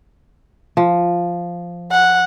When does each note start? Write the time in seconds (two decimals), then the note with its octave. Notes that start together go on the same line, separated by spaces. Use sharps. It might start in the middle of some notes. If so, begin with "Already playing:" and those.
0.77 F3
1.91 F#5